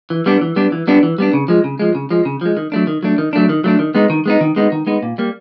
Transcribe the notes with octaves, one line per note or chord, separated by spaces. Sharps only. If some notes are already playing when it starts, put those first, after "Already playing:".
E3
G3 B3 D4
E3
G3 B3 D4
E3
G3 B3 D4
E3
G3 B3 D4
C#3
F3 G#3
C#3
F3 G#3
C#3
F3 G#3
C#3
F3 G#3
D#3
F#3 A3 D4
D#3
F#3 A3 D4
D#3
F#3 A3 D4
D#3
F#3 A3 D4
D#3
G#3 B3 D#4
D#3
G#3 B3 D#4
D#3
G#3 B3 D#4
D#3
G#3 B3 D#4
A#2
G3 A#3